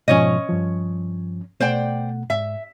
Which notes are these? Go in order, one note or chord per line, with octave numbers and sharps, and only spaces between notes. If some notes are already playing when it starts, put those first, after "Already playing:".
G#2 B2 F3 C#4 C#5 D#5
G2 F3
B2 A3 C5 D5 F#5 G5
G#2 E5